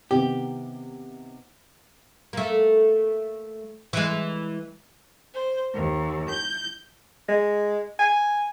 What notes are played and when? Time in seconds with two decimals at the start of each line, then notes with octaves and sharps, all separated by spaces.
0.11 C3 D#3 B3 G4
2.33 A3 A#3
3.93 E3 G#3
5.33 C5
5.73 D#2
6.29 G6
7.28 G#3
7.99 G#5